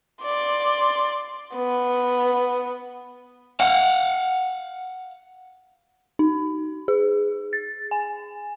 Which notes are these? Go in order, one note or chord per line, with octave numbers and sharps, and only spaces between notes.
D5 C6
B3
F5 F#5
D#4
G#4
A6
G#5